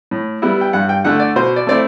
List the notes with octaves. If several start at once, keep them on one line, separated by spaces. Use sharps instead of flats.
A2
G3 B3 E4
G5
G2 F#5
G5
D3 A3 F#5
D5
B2 C5
D5
A3 C4 E4 D5